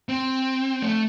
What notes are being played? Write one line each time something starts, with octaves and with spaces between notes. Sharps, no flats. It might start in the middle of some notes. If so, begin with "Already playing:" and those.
C4
A3